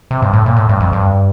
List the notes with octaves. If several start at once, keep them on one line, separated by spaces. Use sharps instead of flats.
C3
G2
A2
A#2
A2
G2
F2
G2